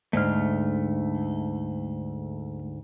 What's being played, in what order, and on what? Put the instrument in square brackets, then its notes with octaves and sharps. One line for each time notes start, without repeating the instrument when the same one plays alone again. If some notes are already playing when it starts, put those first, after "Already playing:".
[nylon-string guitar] D2 G#2 [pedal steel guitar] A3 F6